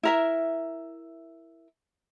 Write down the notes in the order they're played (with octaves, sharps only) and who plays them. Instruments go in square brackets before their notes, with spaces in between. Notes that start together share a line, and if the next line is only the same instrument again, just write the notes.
[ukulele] E4 A#4 E5